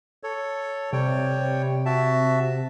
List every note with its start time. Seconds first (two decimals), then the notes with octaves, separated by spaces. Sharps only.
0.23 A4 C#5
0.93 C3 G3 C#5 G5
1.86 F#4 E5 A5